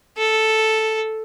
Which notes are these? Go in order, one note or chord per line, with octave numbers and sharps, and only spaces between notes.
A4